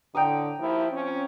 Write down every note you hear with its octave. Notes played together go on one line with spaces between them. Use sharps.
A2 D3 G5 A#5 D#6
D#2 F3 E4
F3 C4 C#4